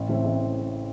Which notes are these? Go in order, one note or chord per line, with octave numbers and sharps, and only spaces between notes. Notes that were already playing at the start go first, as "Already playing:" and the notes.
Already playing: A1
A2 E3 A3 C4
A1